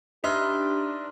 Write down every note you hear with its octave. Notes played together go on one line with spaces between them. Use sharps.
D4 D#4 G4 B4 D#5 E5 C6 F6